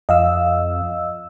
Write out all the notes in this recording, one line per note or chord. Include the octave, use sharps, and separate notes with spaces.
F2 D#5 F5 E6